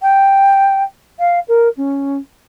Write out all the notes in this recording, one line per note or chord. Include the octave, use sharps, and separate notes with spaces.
G5
F5
A#4
C#4